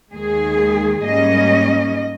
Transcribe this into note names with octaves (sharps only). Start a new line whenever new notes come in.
D#2 D#3 G#3 G#4
G#2 G3 A#3 C#4 D#5